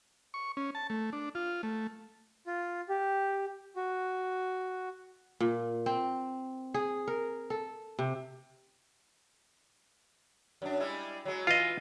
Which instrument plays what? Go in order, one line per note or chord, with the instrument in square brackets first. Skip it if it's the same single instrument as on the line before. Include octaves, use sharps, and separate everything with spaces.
[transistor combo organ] C#6
C#4
A5
A3
D4
F4
A3
[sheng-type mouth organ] F4
G4
F#4
[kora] A#2
C4
G#4
A#4
A4
C3
[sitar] F#2 D4
G3 G#3 E4
F#3 G#3
[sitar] E3 [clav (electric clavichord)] F4 D#5